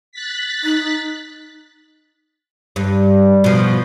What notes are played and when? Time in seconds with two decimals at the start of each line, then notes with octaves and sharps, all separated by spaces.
0.12 F#6 A6 B6
0.64 D#4
2.76 G2
3.44 B2 F3